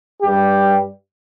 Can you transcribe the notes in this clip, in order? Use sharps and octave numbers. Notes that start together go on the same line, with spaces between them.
G2 G3 G4